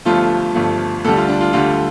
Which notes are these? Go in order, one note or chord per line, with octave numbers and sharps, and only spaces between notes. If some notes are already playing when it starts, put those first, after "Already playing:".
G1 G2 F3 A3 F4
G1 G2 F3 A3
D2 D3 G3 A4
F4
D4
F4
D2 D3 G3 F4